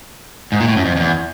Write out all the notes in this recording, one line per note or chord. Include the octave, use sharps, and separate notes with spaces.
G#2
A#2
A2
F#2
F2
F2
E2